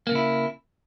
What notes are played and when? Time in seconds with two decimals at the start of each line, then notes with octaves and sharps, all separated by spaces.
0.07 A#3
0.11 C#3
0.15 E4